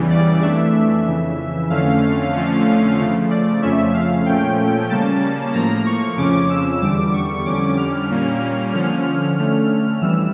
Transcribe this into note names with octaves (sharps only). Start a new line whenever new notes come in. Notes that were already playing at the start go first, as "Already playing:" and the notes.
Already playing: E2 C#3 E3 G3
D5
F2 E3 A3 D4 E5
F2 C#3 E3
F2 D3 A3 C#4 F5
F2 D3 F3 A3 C#4
C#3 F3 A3
D5
F2 C#3 F3 A3 C#4 E5
F5
A#2 F3 A3 C#4 G5
C#3 G3 A#3 C#4 A5
A2 F3 A#3 A#5
C#6
F2 C#3 F3 C#4 D6
E6
E2 D3 G3 D6
C#6
F2 D3 G3 C#4 D6
F6
A#2 G3 A#3 C#4
D3 F3 C#4 F6
D3 A3 C#4
F2 E3 G3 E6